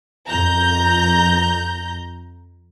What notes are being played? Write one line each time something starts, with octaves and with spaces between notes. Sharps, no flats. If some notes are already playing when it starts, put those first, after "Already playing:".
F2 A#5 G6